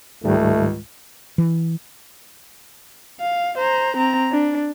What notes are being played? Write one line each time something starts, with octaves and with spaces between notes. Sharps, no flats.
C#2 G#2 D#3 G3 A3
E3
F5
C5 A#5
C4 A#5
D4